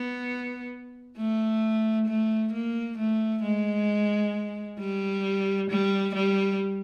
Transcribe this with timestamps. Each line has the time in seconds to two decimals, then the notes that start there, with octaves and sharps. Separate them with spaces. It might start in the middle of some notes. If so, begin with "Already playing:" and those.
Already playing: B3
1.17 A3
2.07 A3
2.53 A#3
2.98 A3
3.43 G#3
4.79 G3
5.70 G3
6.15 G3